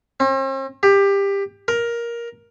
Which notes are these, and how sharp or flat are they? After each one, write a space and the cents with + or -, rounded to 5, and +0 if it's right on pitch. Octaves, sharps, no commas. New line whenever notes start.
C4 +45
G4 +20
A#4 +10